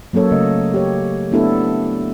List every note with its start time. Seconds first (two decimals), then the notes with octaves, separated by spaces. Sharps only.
0.13 F#3 A#3 C#4 A4 C#5
0.32 C#3 A3 D#5
0.74 G4 C#5
1.32 A3 B3 D4 E4 G4 A4